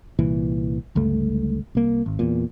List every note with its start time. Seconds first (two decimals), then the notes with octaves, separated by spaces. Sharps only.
0.19 C2 A#2 E3
0.95 G1 C#2 G2 A3
1.75 C2 A#3
2.06 G#1
2.19 E2 A#2